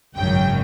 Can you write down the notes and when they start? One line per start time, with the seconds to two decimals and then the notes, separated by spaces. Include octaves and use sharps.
0.17 G#1 F#2 C#3 F#3 G5